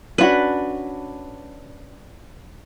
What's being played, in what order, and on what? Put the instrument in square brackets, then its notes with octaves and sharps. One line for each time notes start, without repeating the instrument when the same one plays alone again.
[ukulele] C#4 F4 F#4 [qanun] D4 B4